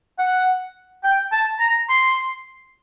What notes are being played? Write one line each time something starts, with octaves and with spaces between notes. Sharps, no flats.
F#5
G5
A5
A#5
C6